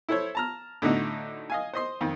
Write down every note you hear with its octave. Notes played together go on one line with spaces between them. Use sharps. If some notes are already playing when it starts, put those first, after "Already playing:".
E4 A4 C5 C#5
A5 A#5 F6
A2 D3 D4 D#4 F#4
D#5 F5 G#5
C5 D#5 C6
F2 D#3